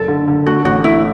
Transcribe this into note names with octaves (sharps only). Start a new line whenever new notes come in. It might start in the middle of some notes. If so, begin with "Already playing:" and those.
Already playing: F#1 A4
D3
D3
A3 F#4
A1 F#4
A3 E4